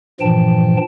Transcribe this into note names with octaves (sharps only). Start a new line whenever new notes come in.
G2 A#2 E3 F3 G5 A5